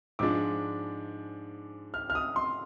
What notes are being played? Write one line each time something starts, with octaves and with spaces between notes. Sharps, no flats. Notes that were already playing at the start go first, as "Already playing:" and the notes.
G#2 F3 G#3 D4 D6
F6
F6
D#6
C6